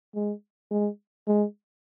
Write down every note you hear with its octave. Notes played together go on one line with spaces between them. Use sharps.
G#3
G#3
G#3